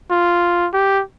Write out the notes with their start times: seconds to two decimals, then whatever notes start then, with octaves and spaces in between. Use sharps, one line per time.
0.11 F4
0.73 G4